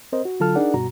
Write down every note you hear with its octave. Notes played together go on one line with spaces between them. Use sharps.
C4 A#4 C5 D#5
F#4
D3 F#3 F4 A4 A5 F6
D4 D#4 G#4 A#4 D5 F#5
G2 B2 F#4 A#5